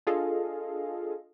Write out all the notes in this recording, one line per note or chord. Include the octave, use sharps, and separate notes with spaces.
D4 F4 G#4 A4 D#5 F5